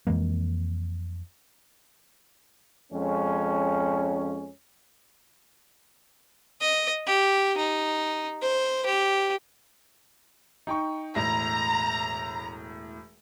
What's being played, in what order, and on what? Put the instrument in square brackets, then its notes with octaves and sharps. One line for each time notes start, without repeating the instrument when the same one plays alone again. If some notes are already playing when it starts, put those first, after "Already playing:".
[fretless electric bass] F2 E3 G#3 A#3
[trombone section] F2 G#3 C#4
[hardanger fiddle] D#5
G4
D#4
C5
G4
[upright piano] D#4 G5 C#6
[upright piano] E1 A2 A#6 [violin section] A#5